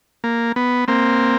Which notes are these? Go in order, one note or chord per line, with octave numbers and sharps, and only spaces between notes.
A#3
B3
A#3 C4